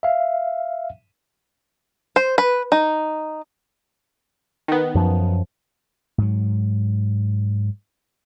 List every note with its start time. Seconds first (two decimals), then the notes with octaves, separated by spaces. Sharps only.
0.03 E5 F5
2.16 C5
2.38 B4
2.72 D#4
4.68 D#3 B3
4.95 F#2 F3
6.18 G#2 F#3